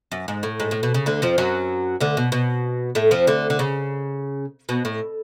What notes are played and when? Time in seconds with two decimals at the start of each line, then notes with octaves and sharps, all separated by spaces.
0.12 F#2
0.28 G#2
0.43 A2
0.60 G#2
0.71 A2
0.83 B2
0.94 C#3
1.06 D2 D3
1.22 F2 F3
1.38 F#2 F#3
2.00 D2 D3
2.17 B2
2.32 B2
2.95 A2 A3
3.11 F2 F3
3.27 D2 D3
3.50 D3
3.59 C#3
4.69 B2
4.85 A2